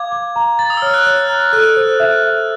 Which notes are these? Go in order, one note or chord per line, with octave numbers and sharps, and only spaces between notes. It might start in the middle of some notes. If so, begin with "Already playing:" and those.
Already playing: F5 D6 G#6
D6
A#5
A#5 A6
D#6
E6
C#5 F6
F#6
C#5
A#5
A4 F#6
C5
E5
E5